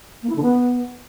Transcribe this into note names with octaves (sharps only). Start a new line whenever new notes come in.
A#3
E4
D3
B3